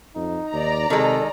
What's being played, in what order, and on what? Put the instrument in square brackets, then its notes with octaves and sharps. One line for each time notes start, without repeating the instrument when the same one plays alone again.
[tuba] F2 [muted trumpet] D#4
[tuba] D#2 [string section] D5 A#5
[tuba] C3 [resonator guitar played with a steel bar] D#3 G#3 [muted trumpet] A4